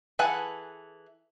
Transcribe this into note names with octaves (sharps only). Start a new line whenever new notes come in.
E3 G#4 A4 B4 F#5